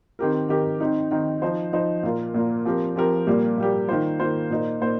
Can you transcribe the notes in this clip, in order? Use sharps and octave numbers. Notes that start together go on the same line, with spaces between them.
D#3 C4 G4 A#4
D#3 C4 G4 A#4
D#3 C4 D#4
D#3 C4 D#4
F3 D#4 C5
F3 D#4 C5
A#2 A#3 F4 A#4
A#2 A#3 F4 A#4
F3 C4 G4 A#4
F3 C4 G4 A#4
A#2 G3 A#3 G4
A#2 G3 A#3 G4
D#3 A#3 F4 C5
D#3 A#3 F4 C5
A#2 A#3 D#4 C5
A#2 A#3 D#4 C5